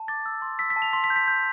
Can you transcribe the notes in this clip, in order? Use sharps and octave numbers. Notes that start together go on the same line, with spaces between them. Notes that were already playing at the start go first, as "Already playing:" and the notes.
Already playing: A5
D6 A6
E6
C6
E6 B6
B6
A5
F7
C6 B6
B6
G6
B6
G6